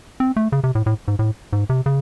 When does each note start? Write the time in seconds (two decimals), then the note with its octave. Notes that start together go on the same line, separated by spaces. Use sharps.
0.20 C4
0.36 A3
0.52 C#3
0.64 C3
0.75 A2
0.86 A2
1.08 G#2
1.19 A2
1.53 G#2
1.70 C3
1.86 C#3